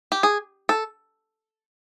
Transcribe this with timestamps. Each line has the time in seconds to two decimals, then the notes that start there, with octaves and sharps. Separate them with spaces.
0.12 G4
0.23 G#4
0.69 A4